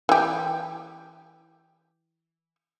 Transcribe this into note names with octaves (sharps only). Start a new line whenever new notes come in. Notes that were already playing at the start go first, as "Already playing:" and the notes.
E3 G4